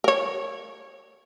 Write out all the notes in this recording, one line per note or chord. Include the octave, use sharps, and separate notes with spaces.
A#4 C#5